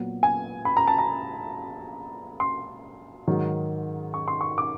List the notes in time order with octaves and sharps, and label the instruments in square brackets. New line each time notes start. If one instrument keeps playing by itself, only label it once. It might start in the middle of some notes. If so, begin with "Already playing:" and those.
Already playing: [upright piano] A#2 F#3 B3
G#5
B5
A#5
A5
A#5
C6
G#2 D#3 F#3
C#6
C6
C#6
D6